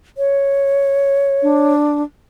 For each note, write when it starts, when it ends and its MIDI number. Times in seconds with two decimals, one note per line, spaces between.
0.18 1.73 73
1.43 2.02 62